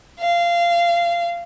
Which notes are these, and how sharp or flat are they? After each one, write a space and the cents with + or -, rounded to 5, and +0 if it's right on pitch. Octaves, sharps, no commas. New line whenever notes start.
F5 -20